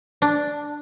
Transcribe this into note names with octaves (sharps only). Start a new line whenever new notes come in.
D4